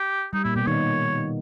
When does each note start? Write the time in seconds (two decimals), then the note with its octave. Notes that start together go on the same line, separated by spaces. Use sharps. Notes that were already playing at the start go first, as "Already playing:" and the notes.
Already playing: G4
0.33 G3 D#4
0.44 A#2 A#3 E4
0.56 B2 B3 G4
0.67 D#3 D#4 C#5